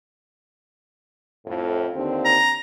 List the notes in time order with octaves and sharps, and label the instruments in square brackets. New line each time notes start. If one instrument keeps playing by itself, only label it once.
[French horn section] F2 A2
D#2 D3 C4
[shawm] A#5